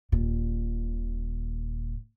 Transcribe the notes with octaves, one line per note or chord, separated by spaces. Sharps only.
D#1 A#2